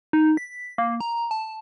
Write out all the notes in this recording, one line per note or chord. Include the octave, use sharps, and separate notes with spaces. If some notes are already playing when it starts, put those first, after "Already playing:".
D#4
B6
A#3
A#5
A5